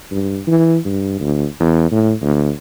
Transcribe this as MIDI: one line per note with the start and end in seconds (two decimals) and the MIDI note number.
0.11 0.41 43
0.47 0.78 52
0.85 1.19 43
1.20 1.46 38
1.60 1.87 40
1.91 2.12 45
2.22 2.50 38